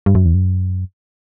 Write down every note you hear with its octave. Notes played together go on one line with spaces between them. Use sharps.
G2
F#2
E2
F#2